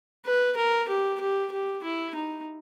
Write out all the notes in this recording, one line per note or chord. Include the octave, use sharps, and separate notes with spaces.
B4
A#4
G4
G4
G4
E4
D#4